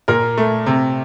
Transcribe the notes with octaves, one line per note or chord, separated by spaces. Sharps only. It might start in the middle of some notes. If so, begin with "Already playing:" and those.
A#2 A#4
A3
C3